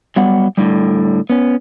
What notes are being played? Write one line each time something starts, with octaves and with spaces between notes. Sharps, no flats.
F#3 G3 B3 F#5
A2 D3 G3
B3 C#4